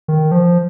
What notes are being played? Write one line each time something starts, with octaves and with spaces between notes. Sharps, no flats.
D#3
F3